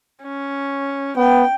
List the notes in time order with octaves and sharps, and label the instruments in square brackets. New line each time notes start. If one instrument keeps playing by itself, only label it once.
[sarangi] C#4
[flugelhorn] B3 [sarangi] G5